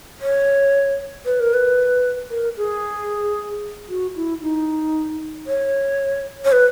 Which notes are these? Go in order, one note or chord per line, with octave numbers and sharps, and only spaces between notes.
C#5
B4
A#4
B4
A#4
G#4
F#4
E4
D#4
C#5
C#5
B4